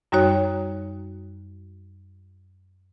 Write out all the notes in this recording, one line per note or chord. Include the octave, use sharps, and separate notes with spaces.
F#2 G3 D#4 F#4 C#5